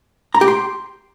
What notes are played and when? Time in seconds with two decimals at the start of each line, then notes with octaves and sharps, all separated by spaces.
0.35 A#5
0.41 G4
0.48 C6